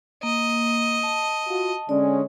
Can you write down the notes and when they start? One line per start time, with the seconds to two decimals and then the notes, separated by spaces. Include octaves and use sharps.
0.23 A#3 D#5
1.03 A5
1.48 F4 F#4
1.89 D3 G#3 C#4 D5